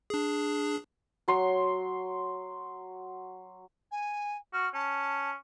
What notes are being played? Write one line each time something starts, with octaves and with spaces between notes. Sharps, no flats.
D4 G#4
F#3 C6
G#5
F#4 F6
C#4 A5